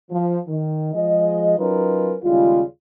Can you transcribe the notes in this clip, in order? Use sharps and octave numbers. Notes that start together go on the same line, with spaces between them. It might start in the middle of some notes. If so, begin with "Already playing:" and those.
F3
D#3
F3 G#3 D#5
F#3 C#4 D#4 F4 A#4 B4
D#2 C#3 G3 G#3 F4